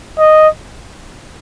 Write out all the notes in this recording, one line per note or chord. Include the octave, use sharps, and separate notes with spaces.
D#5